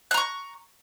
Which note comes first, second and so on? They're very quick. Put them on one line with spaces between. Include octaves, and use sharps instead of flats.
F#6 A#5 C#6